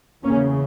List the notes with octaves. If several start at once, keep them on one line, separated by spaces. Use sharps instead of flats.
E2 C#3 A#3 C#4